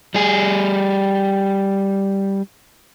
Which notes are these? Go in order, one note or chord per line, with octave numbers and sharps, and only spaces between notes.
G3 G#4